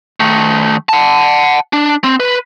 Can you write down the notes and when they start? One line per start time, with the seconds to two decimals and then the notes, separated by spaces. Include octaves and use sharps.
0.20 D#3 A3
0.89 F#5 A5
1.73 D4
2.04 C4
2.20 B4